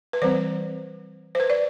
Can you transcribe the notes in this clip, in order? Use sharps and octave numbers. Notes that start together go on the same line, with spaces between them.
B4
E3 G3 C4 C5
C5
B4
D5